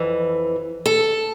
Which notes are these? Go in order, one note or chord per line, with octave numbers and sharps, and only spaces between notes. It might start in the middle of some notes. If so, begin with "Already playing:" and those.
Already playing: F2 E3
A4